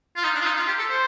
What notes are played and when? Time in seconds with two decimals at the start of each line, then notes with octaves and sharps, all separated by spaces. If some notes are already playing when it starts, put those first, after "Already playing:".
0.16 F4
0.24 D#4
0.35 D4
0.41 F4
0.46 D#4
0.57 F4
0.67 G4
0.78 A4
0.89 C5